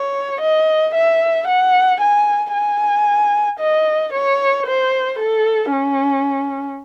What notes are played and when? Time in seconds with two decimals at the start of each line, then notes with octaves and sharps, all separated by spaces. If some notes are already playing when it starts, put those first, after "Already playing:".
Already playing: C#5
0.41 D#5
0.95 E5
1.48 F#5
2.01 G#5
2.54 G#5
3.60 D#5
4.13 C#5
4.66 C5
5.19 A4
5.72 C#4